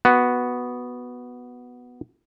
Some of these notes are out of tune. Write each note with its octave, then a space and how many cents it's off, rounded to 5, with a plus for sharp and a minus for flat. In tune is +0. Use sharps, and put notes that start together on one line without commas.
B3 +0 F#4 +0